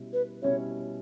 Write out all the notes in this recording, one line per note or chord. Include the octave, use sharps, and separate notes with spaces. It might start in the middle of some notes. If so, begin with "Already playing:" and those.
Already playing: B2 G3 C#4 E4
B4
B2 G3 C#4 E4 C#5